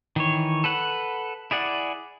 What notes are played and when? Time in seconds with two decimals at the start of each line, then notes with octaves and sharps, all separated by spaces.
0.16 D#3 E3 C#5
0.64 A4 B4 F#5
1.51 E4 G#4 D5 F#5